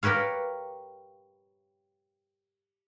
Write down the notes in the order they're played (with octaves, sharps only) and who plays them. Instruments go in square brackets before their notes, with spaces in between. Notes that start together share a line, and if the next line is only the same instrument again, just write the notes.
[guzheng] G4 A#4 B4 C#5 F5